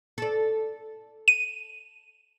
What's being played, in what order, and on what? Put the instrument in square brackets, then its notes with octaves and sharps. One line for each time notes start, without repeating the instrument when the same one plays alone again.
[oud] A4 D5
[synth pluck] D#7